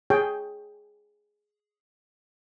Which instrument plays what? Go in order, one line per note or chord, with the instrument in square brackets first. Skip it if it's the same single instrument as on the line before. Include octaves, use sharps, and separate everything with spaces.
[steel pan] G#4 C#5 G5